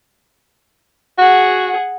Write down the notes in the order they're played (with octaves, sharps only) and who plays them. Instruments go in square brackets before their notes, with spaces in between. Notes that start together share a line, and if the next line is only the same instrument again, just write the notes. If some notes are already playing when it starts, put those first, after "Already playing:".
[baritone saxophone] F#4 [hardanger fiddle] G#4 F#5